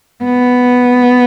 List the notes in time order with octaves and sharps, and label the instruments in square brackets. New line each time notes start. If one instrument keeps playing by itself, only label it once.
[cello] B3